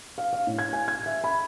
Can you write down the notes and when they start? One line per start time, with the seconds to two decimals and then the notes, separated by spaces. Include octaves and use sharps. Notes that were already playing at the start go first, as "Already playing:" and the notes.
0.18 F5
0.33 F5
0.47 A2
0.58 G#6
0.73 G#5
0.88 G#6
1.06 E5
1.24 B5